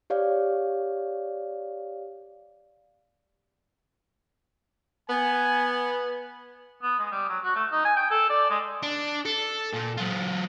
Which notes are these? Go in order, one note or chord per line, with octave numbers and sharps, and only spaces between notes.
G4 C#5 D5 F5
B3 G#5
B3
G#3
G3
F#3
F#4
A3
D#4
G#5
G5
A4
D5
G#3
D4
A4
A#2
F#3 F4